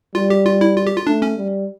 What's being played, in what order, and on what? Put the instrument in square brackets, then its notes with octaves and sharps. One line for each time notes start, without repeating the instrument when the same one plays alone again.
[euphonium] G3 [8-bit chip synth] F4
[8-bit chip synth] G4
F4
E4
F4
G4
F4
[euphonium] A3 [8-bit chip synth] D4
[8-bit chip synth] C#4
[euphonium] G3